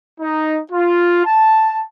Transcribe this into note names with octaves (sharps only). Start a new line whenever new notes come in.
D#4
F4
A5